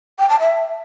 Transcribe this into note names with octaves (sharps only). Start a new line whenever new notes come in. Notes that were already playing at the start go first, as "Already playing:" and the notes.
G5
A5
E5